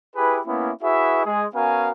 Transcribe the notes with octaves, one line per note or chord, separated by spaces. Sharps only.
E4 G4 G#4 B4
A#3 B3 C#4 E4
E4 F#4 G#4 B4 E5
G#3 G#4
B3 C#4 F#4 A#4 F5 G#5